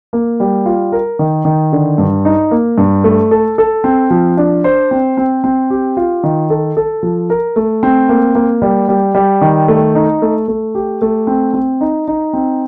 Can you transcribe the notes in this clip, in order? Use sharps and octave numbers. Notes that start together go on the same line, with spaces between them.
A#3
G3
F4
A#4
D#3
D#3
D3
G2
D#4
A#3
G2
A3
A4
A4
C4
F3
D4
C5
C4
C4
C4
G4
F4
D#3
A4
A4
F3
A#4
A3
C4
A#3
A#3
G3
G3
G3
D#3
A3
D#4
A3
A3
G4
A3
C4
C4
D#4
D#4
C4